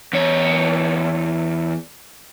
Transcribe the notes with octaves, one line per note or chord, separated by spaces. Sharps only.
E2 C#5